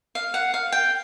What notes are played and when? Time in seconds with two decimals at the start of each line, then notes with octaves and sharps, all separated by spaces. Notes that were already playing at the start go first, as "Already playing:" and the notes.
0.15 F5
0.34 F#5
0.54 F5
0.72 G5